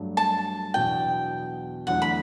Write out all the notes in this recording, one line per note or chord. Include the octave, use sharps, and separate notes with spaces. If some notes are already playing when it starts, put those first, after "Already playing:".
Already playing: G2 F#3 A3 D4
A5
E2 B2 F#3 B3 D4 G5
E2 D3 F#3 A3 F#5
B5